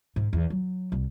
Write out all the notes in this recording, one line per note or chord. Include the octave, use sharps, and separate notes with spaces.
G#2
E2
F#3
C2